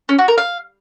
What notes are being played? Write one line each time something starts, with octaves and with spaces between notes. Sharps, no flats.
C#4
F#4
A#4
F5